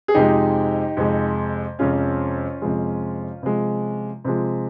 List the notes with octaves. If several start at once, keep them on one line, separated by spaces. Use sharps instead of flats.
G#4
F2 C3 F3 G#3 D#4 G4
F2 C3 F3 G#3
F2 C3 F3 G#3 C#4 F4
F2 C3 F3 G#3
C3 F3 G#3
C3 F3 G#3